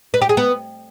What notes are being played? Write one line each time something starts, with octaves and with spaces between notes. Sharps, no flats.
B4
G4
G#4
B3